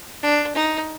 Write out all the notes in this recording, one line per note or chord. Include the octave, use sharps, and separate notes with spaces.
D4
D#4